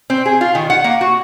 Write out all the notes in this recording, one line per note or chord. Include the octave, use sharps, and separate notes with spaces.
C4
G#4
F4
D#3
F#5
A#3
F#4